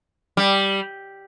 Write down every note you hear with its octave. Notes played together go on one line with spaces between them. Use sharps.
G3